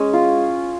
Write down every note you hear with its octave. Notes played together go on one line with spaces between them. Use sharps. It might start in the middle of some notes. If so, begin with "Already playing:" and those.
Already playing: G#3 C#4
F4